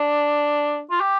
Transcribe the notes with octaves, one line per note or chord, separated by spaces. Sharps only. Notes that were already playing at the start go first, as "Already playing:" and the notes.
Already playing: D4
F4
G4